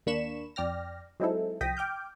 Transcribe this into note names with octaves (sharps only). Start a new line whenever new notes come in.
D#2 A#3 D4 B5 C#6 E7
F2 D5 G5 F6 A#6
F#3 G#3 C4 D#4 E4 A4
C2 F3 G5 D#6 A#6 B6
G5 D6 F6 G6